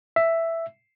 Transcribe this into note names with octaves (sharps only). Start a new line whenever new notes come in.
E5